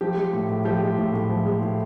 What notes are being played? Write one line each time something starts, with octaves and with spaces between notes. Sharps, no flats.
F3 G4
G#3
A2
A2
F3 G4
G#3
A2
A2
F3
G#3
A2